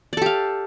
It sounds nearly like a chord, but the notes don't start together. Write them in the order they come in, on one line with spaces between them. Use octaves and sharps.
D5 A4 G4 F5